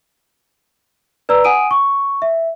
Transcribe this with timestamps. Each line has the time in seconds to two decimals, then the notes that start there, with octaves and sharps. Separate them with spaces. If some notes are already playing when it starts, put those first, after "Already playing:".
1.29 B4 D5 A#5 E6
1.44 F#5 G#5 D#6 D7 D#7
1.71 C#6
2.22 E5